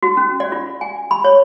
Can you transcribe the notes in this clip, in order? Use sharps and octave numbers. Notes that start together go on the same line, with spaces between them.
F#4
C#4
D5
F4
G#5
B5
C#5